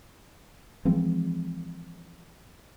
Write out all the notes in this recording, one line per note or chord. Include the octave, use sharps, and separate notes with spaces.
E3 F3 G#3 C4